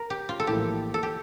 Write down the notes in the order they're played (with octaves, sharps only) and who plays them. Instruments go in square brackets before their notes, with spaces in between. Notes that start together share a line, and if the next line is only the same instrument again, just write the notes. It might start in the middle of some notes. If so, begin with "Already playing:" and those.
Already playing: [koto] A#4
G4
F4
A4
[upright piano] A#1 A2 E3 A#3 E4 [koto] G4
[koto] A4
G4